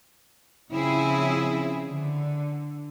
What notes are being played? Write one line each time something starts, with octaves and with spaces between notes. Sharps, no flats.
C#3 F3 C4 E4 G#4
D3